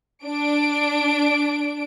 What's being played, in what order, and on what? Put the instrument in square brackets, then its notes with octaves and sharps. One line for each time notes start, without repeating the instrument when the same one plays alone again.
[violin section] D4 D7